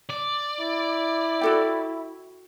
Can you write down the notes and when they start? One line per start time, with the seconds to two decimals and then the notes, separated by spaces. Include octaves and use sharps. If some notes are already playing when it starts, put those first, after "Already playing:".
0.10 D5
0.60 E4
1.41 F#4 A4 G5